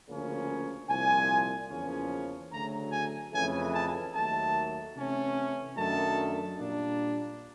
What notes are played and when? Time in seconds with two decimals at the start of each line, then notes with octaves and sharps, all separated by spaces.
0.08 D2 C#3 F3 A#3 C#4
0.88 C2 A#2 F3 G#5
1.70 E2 C#3 F3 A#3 C#4
2.51 D2 C#3 F#3 A3 A#5
2.92 G#5
3.33 F2 C#3 E3 A3 C#4 G#5
3.73 A5
4.14 D#2 D#3 F#3 A3 A5
4.95 C3 E3 A3 C#4
5.76 F#2 D#3 F#3 A3 D4 A5
6.58 A#2 G3 A#3 D4